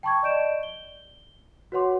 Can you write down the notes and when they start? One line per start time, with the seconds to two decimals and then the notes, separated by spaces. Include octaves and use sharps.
0.03 G5 A5 B5 C#6 D6 G#6
0.23 D5 D#5 G6 D7 E7
0.63 G7
1.72 F#4 B4 C#5 F#5 C6 D6